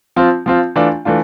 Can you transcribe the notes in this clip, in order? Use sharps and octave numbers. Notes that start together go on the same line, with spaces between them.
F3 C4 F4
F3 C4 F4
E3 A3 D4 F4
E3 A3 D4 F4